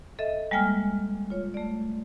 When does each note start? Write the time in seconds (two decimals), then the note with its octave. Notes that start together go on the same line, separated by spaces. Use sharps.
0.19 A4 D#5 E5
0.51 G3 G#3 A#3 G5 G#5 F6
1.30 F4 C#5
1.54 A3 D5